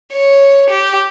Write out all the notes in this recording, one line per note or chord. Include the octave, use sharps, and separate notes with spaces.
C#5
G4